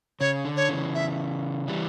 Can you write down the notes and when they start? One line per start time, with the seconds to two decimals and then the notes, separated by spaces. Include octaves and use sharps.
0.20 C#3 C#5
0.45 D3
0.57 C#5
0.69 C#3 E3
0.94 E5
1.68 E3 G3